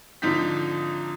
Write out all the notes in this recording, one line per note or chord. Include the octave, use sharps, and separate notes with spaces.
G#1 D3 F3 D#4 G6 B6